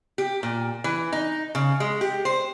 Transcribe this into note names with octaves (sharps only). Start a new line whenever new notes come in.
G4
A#2
E3
D#4
C#3
G#3
G4
C5